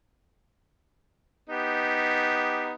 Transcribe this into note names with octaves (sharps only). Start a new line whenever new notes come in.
B3 D#4 G4